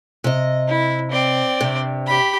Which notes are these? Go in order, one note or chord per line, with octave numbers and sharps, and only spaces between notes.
C3 D#5
E4
C4 D5
G2 C3
G4 B5